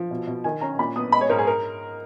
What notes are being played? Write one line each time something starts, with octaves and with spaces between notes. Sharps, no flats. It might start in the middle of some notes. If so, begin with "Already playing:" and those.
Already playing: F3
B2
B2
D#3 G#5
C#4 A#5
A#2 B5
B3 D#6
G#3 B5
C#5
G#2 A#4
G#4
A#4